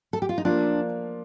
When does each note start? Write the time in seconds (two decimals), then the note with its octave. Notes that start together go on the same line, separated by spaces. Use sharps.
0.13 A4
0.22 G4
0.29 F4
0.38 D#4
0.45 F3 A#3 D4 F4